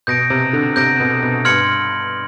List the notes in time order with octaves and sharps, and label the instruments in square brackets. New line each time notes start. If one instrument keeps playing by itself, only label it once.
[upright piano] B2 [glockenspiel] G6 A#6 D7
[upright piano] C3
D3
[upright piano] C3 [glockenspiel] G6 A#6 D7
[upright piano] B2
B2
[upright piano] G2 [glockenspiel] C6 F6 G#6 C#7 F#7